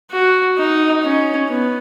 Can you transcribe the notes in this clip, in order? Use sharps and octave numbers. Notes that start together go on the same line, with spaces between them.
F#4
D#4
C#4
B3